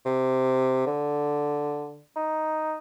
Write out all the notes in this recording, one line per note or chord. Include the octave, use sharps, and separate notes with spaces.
C3
D3
D#4